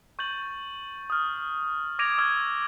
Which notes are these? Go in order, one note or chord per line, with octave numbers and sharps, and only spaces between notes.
C#6 G6 A6 F#7
D#6 F6
D6 G#6 A#6 D7 D#7 F7
C#6 E6 F6 G#6